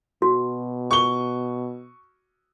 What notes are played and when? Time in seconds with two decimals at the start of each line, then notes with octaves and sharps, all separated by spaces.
0.22 B2 F#4
0.91 C#6 G7